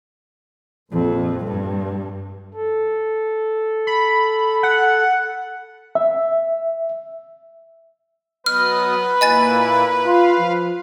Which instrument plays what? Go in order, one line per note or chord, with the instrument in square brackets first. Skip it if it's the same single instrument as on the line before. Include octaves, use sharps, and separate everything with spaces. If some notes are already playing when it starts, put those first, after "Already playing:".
[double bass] A#1 F2
G2
[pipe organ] A4
[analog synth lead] B5
F#5
[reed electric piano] E5
[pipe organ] F#3 B3 D#5 [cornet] B4 [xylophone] F6
[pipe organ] A#2 A#3 E4 [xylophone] D#5 G#5 A6
[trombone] F4 [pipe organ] F5
[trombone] F3